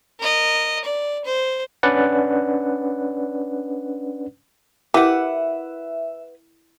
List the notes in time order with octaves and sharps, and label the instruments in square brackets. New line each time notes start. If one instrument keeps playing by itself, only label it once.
[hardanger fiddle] A#4 D#5
D5
C5
[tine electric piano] C#4 D4 B4 D5 F#5
[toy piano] E4 A#4 D6 [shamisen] G4 [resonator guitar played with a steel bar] B4 F#5 [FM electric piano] E5